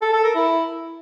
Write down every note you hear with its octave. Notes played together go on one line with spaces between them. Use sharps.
A4
A4
A#4
E4